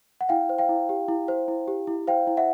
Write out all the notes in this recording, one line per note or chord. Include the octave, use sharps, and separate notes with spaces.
F#5
E4 F5 G5
C5
F5 G5
E4
G4
E4
C5
E4
G4
E4
C5 F5 G5
E4
E5 F#5